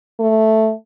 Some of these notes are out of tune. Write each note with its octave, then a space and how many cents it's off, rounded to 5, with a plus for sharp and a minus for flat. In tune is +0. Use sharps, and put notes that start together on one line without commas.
A3 +0